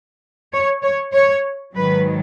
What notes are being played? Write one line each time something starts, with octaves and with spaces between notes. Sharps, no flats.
C#5
C#5
C#5
G#2 D#3 F#3 B4